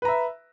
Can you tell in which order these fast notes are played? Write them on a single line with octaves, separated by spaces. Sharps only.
B4 A#5 E5